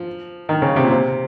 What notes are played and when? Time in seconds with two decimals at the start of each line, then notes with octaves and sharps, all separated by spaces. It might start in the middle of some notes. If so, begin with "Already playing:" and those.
Already playing: F3
0.49 D#3
0.62 C#3
0.76 C3
0.84 A#2
0.90 C3